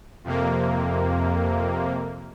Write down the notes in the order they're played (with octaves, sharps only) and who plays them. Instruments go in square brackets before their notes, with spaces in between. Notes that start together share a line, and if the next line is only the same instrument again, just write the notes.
[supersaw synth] F2 C3 A#3